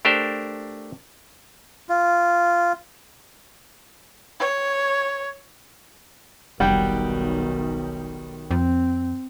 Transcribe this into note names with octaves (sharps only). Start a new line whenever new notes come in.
A3 D4 G4 A#4 C5
F4
C#5
F1 B1 D#3 G3 F#5 G5
F2 C4